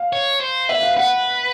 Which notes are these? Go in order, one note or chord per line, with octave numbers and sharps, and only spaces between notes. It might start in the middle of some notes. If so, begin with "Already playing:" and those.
Already playing: F5
C#5
C5
B4 E5
F5
B4 F#5